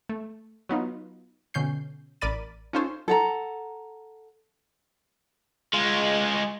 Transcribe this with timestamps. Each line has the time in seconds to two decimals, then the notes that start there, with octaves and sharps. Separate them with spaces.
0.09 A3
0.69 F#3 B3 D#4 F4
1.54 B2 D3 C#4 G6 C7
2.21 A1 A#4 D5 B5 A6 D#7
2.73 C#4 D#4 F4 A4 C5 C#5
3.08 A4 F#5 A#5
5.73 G#3 F4